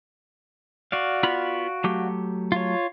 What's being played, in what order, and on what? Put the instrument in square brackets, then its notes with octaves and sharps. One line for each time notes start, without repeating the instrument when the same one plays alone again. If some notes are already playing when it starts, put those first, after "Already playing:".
[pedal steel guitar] F#4 D5 F5
[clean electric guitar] B3 F4 B5
F#3 A3 G4
[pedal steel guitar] F4 C#5